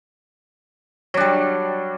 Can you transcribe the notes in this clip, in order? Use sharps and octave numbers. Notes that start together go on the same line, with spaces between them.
F#3 G3 D4